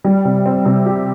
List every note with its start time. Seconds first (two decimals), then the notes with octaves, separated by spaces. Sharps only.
0.04 G3
0.25 C3
0.46 C4
0.66 C3
0.86 G4